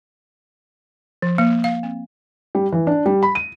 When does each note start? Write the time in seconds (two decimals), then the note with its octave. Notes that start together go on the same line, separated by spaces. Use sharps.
1.22 F3
1.38 A#3
1.64 F5
1.83 C4
2.55 G3
2.72 E3
2.87 D4
3.06 G3
3.23 B5
3.35 D#7